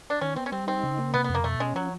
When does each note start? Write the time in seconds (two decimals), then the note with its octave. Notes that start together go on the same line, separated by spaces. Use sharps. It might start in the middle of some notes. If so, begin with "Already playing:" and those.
0.10 D4
0.21 D#3 C#4
0.36 B3 C4
0.46 C#4
0.52 G3 C4
0.67 C4 D#4
0.83 C#3
0.98 A#3
1.14 C3 B3
1.24 F2 B3
1.35 A#3
1.44 B2 A3
1.60 G#3 C#4
1.75 F3 F#3